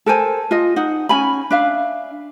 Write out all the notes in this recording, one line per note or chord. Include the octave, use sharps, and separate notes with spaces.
A4 A#4 C5 G#5
F4 D#5
D#4 F#5
C#4 G#5 B5
D4 E5 F5